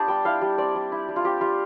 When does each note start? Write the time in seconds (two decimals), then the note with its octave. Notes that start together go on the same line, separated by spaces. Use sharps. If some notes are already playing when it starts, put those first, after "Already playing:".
Already playing: B3 D4 F4 G4 D5 A5
0.08 G3 G5
0.25 E4 F5
0.42 G3
0.58 C4 D5
0.75 G3
0.92 E4
1.09 G3
1.16 F4
1.24 C4 G4
1.41 G3 F4